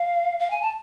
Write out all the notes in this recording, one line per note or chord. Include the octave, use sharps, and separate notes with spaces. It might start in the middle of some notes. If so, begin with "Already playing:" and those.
Already playing: F5
F5
G#5
A5